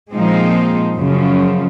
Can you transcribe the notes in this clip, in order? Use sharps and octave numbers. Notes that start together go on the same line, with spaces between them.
A#2 F3 G#3 C4 D#4
F#2 C#3 F3